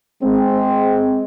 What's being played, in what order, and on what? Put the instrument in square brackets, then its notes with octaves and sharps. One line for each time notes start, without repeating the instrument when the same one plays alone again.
[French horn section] G#3 C4